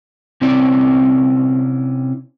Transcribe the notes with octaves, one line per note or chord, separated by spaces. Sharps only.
C3 C4 C#4 E4 D5